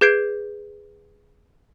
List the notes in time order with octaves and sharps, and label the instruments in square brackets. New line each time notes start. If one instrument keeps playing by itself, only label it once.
[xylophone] G#4 B4 G6 G#6 C7 D7